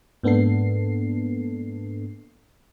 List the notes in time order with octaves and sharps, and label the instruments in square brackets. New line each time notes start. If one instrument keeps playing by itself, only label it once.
[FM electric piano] G#2 A#3 B3 D4 A4 C7